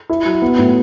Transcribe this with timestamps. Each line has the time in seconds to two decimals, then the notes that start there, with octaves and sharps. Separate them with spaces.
0.09 E4
0.25 F#3
0.42 B3
0.58 A2